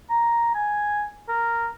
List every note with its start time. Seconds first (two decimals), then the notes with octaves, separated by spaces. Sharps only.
0.10 A#5
0.55 G#5
1.29 A#4